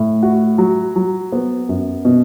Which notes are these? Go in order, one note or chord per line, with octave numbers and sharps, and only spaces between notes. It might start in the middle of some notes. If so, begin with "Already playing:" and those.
Already playing: A2
F#4
F#3
F#3
B3
F#2
B2